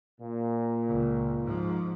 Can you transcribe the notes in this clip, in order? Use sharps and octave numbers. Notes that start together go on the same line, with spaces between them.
A#2
C#2
G#2 F3